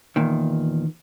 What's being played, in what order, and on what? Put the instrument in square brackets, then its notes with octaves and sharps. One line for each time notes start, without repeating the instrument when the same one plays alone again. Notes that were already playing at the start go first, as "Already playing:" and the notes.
[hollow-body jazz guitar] E2 A#2 D#3